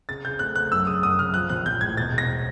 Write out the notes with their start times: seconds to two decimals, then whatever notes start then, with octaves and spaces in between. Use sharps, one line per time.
0.09 C#3 A6
0.25 C#3 G6
0.39 A3 F#6
0.55 A3 F#6
0.72 F#2 E6
0.87 C#3 D#6
1.03 F#2 D#6
1.19 C#3 F6
1.34 F3 F#6
1.49 A#1 F#6
1.66 A#1 G6
1.81 A2 G#6
1.97 E1 A6
2.13 E1 A#6